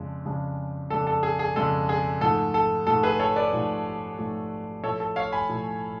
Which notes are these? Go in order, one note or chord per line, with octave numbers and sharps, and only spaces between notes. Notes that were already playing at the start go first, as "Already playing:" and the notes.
Already playing: F2 C#3 G#3 D4
F2 C#3 G#3 D4
F2 C#3 G#3 D4 A4
A4
G#4
G#4
F2 C#3 G#3 D4 A4
G#4
G#2 F3 A3 A4
A4
G#2 F3 A3 A4
G#4 B4
A4 C#5
B4 D5
G#2 F3 A3
G#2 F3 A3
A2 F3 A3 A4 C#5
A4
C#5 F5
G#5 B5
A2 F3 A3